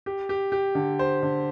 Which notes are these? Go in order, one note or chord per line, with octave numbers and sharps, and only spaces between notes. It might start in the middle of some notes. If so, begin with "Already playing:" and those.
G4
G4
G4
D3
C5
D3